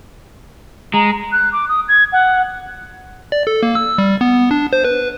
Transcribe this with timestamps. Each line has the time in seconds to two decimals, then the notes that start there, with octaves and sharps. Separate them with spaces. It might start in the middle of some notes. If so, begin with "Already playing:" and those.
0.94 G#3 A#5
1.32 F#6
1.53 D6
1.69 D#6
1.88 G#6
2.13 F#5
3.32 D5
3.47 A4
3.63 A#3
3.75 E6
3.98 G3
4.21 B3
4.51 D4
4.73 C5
4.84 B4